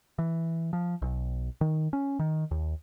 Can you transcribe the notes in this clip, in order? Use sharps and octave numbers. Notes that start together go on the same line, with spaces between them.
E3
F3
B1
D#3
C#4
D#3
D#2